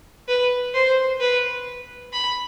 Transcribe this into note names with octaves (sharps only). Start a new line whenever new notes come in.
B4
C5
B4
B5